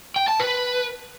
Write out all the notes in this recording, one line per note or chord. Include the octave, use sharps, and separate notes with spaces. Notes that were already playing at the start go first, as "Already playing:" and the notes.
G5
A5
B4